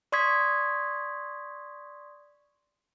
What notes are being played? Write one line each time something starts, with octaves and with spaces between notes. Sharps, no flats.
D5 C6 C#6 D#6 G#6 B6